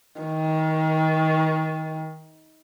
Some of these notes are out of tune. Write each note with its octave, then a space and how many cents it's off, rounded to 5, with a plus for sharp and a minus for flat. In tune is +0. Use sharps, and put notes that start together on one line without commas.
D#3 +25